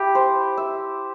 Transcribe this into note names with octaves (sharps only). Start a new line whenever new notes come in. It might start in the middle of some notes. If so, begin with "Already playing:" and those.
Already playing: E4 G4
C5
E5